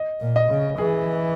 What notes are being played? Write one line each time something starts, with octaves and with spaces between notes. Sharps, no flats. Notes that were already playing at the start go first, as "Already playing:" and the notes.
Already playing: D#5
A#2
D#5
C#3
E3 G#4